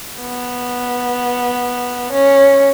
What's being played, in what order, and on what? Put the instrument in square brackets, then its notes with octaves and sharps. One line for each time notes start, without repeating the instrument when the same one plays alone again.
[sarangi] B3
C#4